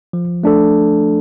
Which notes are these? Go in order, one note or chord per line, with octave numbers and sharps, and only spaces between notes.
F3
A3 D4 A4